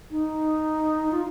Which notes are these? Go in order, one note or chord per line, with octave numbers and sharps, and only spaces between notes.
D#4
F4